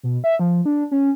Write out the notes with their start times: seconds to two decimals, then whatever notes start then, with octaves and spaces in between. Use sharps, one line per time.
0.03 B2
0.24 E5
0.39 F3
0.66 D4
0.91 C#4